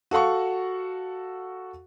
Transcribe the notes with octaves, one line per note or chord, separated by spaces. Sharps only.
F#4 A4 F5 F#5 C#6